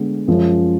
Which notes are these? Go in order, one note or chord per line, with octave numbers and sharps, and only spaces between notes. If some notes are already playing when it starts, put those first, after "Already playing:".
Already playing: D3 G#3 B3
F#2 F3 G#3 C#4 F4